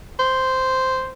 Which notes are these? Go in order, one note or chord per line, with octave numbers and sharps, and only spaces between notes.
C5